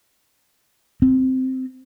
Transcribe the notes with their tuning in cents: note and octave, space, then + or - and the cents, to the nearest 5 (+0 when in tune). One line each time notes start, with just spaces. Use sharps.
C4 -5